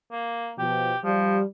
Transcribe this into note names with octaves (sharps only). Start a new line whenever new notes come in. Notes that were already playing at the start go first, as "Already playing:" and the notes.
A#3
B2 F3 G4
F3 G3